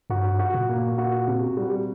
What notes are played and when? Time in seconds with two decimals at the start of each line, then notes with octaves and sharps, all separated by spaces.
0.10 G2 F#4
0.39 F#4
0.54 A#2
0.69 A#3
0.98 F#4
1.27 C3
1.57 G3